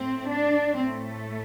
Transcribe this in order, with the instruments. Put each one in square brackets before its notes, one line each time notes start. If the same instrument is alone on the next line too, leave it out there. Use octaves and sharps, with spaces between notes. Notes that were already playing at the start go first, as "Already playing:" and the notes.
Already playing: [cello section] A2 A3 C4
D4
A2 A3 C4